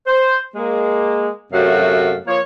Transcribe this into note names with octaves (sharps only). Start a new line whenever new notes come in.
C5
G#3 A#3
F#2 C3 A3 F#4 F5
F3 A#3 C#5